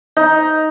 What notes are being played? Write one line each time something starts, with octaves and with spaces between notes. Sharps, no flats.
D#4